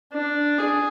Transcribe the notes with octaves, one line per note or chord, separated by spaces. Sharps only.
D4
G#4